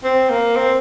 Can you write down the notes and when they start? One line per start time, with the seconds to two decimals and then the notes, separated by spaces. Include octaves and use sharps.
0.04 C4
0.30 A#3
0.56 C4